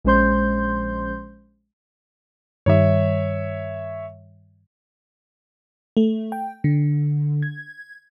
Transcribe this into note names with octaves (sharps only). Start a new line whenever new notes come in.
A#1 G#3 C#4 C5 C6 G6
G2 D#3 G3 C#5 E5
A3
G5
D3
G#6